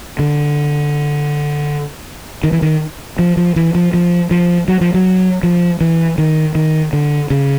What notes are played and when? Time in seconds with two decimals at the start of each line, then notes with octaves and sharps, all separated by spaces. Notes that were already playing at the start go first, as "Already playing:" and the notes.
0.19 D3
2.44 D#3
2.53 E3
2.62 D#3
3.19 F3
3.37 F3
3.56 E3
3.75 F3
3.94 F3
4.31 F3
4.68 F#3
4.81 F3
4.94 F#3
5.43 F3
5.81 E3
6.18 D#3
6.55 D#3
6.93 D3
7.30 C#3